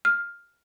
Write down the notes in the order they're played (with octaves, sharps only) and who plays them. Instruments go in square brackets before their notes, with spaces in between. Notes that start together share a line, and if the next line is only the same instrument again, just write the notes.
[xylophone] F6